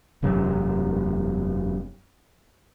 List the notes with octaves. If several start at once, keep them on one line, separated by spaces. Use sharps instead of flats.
E1 F#2 C3 F#3